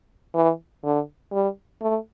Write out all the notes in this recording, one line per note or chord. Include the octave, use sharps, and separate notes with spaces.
E3
D3
G3
A3